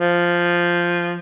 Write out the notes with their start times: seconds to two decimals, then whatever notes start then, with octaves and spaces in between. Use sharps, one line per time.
0.01 F3